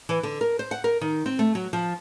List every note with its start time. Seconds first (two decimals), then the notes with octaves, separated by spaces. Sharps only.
0.09 E3
0.23 D3
0.41 A#4
0.59 C5
0.71 F#5
0.84 A#4
1.01 D#3
1.26 C4
1.39 A3
1.55 F#3
1.73 F3